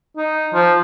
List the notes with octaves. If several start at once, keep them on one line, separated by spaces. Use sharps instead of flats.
D#4
F3